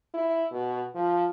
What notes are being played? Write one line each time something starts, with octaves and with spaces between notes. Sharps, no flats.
E4
B2
F3